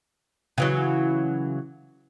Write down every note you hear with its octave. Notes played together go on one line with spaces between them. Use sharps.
C#3 E3 F#3